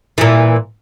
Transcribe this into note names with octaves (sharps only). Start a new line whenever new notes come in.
A#2 E3